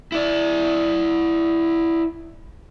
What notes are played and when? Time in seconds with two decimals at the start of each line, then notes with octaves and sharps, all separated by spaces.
0.12 E4 D5